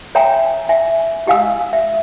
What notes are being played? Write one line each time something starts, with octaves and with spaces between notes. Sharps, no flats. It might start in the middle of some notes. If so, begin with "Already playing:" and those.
C#5 E5 G5 G#5 A#5
E5 G#5
E4 G4 D#5 F5 G#5 E6
E5